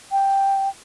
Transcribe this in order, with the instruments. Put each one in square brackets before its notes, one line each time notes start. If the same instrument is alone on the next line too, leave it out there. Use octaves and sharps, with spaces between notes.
[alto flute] G5